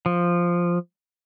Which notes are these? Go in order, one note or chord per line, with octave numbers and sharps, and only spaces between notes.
F3